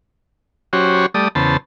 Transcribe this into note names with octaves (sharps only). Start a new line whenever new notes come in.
F#3 C#4 F#4 G4 C5 C#5
G3 A3 D5 D#6
E2 C#3 B3 C5 A5